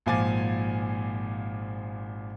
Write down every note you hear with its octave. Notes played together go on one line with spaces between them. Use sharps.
G#1 A#2 F3 G#5 D6 A6